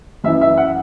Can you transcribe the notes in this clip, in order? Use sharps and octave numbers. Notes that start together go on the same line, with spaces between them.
F#2 E3 E5
E5
F#5